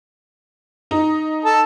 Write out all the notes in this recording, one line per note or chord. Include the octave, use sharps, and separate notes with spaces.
D#4
A4 A5